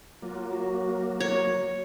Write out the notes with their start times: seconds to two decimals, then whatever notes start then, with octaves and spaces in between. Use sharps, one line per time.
0.22 F#3 A#3 F4
0.50 F#4
1.20 C#5